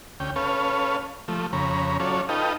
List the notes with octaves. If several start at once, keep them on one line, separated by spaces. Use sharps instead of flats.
D2 C#4 G5
C#4 A4 B4 C#5 F5
F3 A3
F2 C#3 C#5 A#5 B5
F#3 C#4 F4 A4 C#5 D5
D#4 F4 A4 B4 D#5 G5